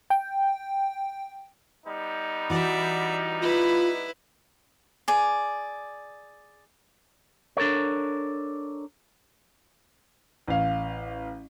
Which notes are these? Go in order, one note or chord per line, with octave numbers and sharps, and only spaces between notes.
G5
G3 B3 D#4
E3 F#4 D5 E5
E4 F4 B4
G#4 D5
D4 A4 A#4 C#5
A1 F5